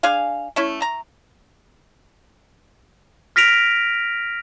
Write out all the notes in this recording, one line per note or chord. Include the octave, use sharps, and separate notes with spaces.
D4 G#4 F5 G#5
A3 C#4 E4
A#5
F6 A#6 B6 D7 F7